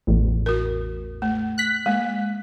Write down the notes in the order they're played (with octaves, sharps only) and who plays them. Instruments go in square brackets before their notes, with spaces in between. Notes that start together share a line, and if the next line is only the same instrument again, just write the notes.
[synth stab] A1 E2
[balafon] F#4 A#4
A3
[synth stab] F#6 B6
[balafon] G#3 A#3